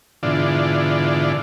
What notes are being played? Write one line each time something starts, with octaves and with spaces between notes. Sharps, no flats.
G#2 B2 D3 E3 D4 F4